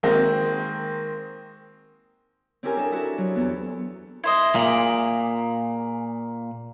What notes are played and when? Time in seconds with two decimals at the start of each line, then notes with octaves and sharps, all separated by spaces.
0.03 D#3 G#3 A#3 C4 F#4
2.63 C4 C#4 E4 G4 A#4 G#5
2.77 D4 A4 A#4 D#5
2.92 E4 F#4 A4
3.18 F#3
3.36 E2 B3
4.24 E4 C5 D#5
4.55 A#2 G#4 D6